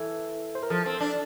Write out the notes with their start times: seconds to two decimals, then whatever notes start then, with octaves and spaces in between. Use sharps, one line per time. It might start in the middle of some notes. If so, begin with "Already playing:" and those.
Already playing: E3 A4
0.55 C5
0.63 A#4
0.70 F3 A4
0.86 C4
1.00 D4